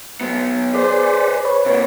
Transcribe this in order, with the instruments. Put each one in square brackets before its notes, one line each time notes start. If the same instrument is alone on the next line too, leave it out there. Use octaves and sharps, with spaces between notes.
[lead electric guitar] F#3 B3
[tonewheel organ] G#4 D5 [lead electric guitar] B4 C5
[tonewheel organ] B4 C#5
[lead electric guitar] C3 A#3